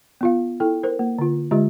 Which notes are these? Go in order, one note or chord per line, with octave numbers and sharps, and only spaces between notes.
B3 F4 F5
E4 A4 G5
A#4 C5
A#3
D3 F4
D3 G#3 F4 G4 D#5